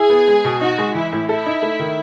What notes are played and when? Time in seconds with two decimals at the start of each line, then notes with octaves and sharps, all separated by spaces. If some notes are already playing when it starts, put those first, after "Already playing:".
Already playing: E4 G#4
0.10 B3
0.27 G#3
0.44 B2
0.61 D#4 F#4
0.78 G#3
0.95 E3 E4
1.12 A2
1.29 E4 A4
1.46 D#4
1.62 A3
1.79 D#3